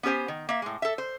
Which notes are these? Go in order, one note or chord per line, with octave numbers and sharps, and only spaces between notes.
B3 C#4 G4 C5 G#5
D#3
A#3 E5
A2 G#3
A4 E5
C5